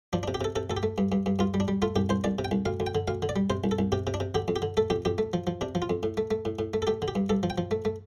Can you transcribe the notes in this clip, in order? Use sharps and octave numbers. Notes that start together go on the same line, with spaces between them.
F3 D4
D4
C3
G4
C3 A4
C3 A4
D2 A4
G4
A3
G2
G2
G2
G2 F4
G3
D4
G3
A3 F4
C2 G4
C2 C5
C2 D5
C3
G5
C2
D2 F5
D2
G5
D3
D2 F5
D3
D5
G3
C3 C5
C2
A4
C2
C3 G4
C3
D4
C3
D3 G4
F2
G4
D3
A3 A4
F2 G4
F2 G4
A3
F3
F3
C3 D4
F3
F4
F2
A2
A3
A3
A2
A2
A3
A4
A3 G4
D3
G4
G2
G2 A4
F3
G5
F3
A3
A3